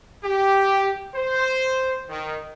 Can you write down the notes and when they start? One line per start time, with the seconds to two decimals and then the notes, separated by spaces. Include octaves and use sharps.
0.24 G4
1.15 C5
2.10 D#3